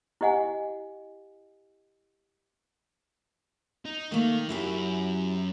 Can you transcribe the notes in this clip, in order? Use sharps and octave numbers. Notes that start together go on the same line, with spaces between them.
E4 G4 D#5 F#5 G#5
D#4
D#3 A3 A#3
F#2 E4 F#4 G4